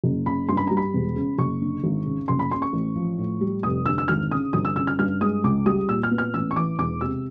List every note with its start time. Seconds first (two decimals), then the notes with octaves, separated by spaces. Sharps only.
0.04 F#1
0.26 C#3 B5
0.49 G2 C6
0.57 B5
0.67 G3 A#5
0.77 B5
0.94 E1
1.16 C#3
1.38 F#1 C#6
1.62 D3
1.84 G#1
2.06 C#3
2.28 F#1 C6
2.39 B5
2.51 C#3 C6
2.62 C#6
2.73 A1
2.96 F3
3.18 A2
3.41 G3
3.63 F1 D#6
3.86 D3 E6
3.98 E6
4.08 G#1 F6
4.31 C#3 D#6
4.53 G1 D#6
4.65 E6
4.76 C#3 E6
4.87 F6
4.99 G2 F6
5.21 G#3 D#6
5.44 C#2 D6
5.66 G3 D#6
5.88 A#2 E6
6.03 F6
6.11 B3
6.18 F6
6.34 A1 E6
6.51 C#6
6.56 E3 D6
6.79 E1 D6
7.01 C3 E6